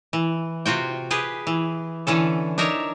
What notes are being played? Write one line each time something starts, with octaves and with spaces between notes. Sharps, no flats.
E3
C3 F4 F#4 G5
G4 G#4 B4
E3
D3 E3 C#4 A4
D4 D#4 A#4 C#5 E5